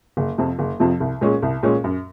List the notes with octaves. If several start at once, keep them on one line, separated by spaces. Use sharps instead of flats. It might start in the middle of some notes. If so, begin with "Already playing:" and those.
F#1
F2 C3 F3
F#1
F2 C3 F3
C2
A#2 G#3 C#4
C2
A#2 G#3 C#4
F#2